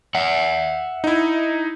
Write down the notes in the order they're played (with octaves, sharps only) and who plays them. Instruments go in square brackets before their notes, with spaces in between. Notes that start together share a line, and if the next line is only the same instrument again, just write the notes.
[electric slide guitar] E5 F#5
[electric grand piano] D#4 E4